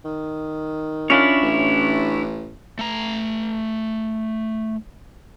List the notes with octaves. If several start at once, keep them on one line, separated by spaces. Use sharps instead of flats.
D#3
C#4 D4 E4 F4 C#5
A1
A3 A#5